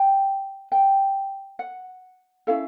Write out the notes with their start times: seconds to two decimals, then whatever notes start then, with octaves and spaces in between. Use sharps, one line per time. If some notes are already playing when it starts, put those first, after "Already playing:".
Already playing: G5
0.72 G5
1.59 F#5
2.47 C#4 E4 A4 F5